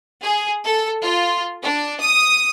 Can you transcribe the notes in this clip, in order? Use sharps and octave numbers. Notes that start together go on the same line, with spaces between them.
G#4
A4
F4
D4
D#6